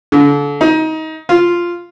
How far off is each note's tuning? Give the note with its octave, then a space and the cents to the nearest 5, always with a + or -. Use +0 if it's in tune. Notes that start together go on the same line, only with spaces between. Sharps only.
D3 -35
D#4 +25
F4 -5